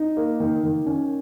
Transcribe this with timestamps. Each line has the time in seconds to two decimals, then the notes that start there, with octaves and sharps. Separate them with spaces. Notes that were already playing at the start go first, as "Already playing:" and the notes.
Already playing: D#4
0.17 A#3
0.40 D#3
0.64 D#3
0.86 C#4